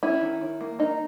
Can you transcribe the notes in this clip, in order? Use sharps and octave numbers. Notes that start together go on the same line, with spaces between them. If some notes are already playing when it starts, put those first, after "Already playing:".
C#4 E4
D#3
D#3
A#3
D#3 D#4